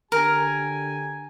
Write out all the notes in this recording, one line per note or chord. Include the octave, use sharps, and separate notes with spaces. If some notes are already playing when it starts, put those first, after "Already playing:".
D3 G4 A#4 G#5